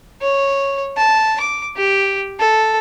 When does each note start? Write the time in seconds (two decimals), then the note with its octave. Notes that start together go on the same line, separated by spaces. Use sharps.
0.22 C#5
0.97 A5
1.40 D6
1.77 G4
2.39 A4